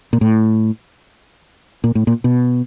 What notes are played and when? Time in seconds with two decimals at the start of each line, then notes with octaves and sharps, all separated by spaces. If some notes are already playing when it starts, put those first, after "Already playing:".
0.13 A#2
0.21 A2
1.84 A#2
1.95 A2
2.07 A#2
2.24 B2